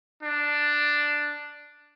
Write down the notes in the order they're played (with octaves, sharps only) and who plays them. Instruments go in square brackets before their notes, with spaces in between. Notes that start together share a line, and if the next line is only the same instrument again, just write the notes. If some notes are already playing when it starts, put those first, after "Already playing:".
[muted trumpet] D4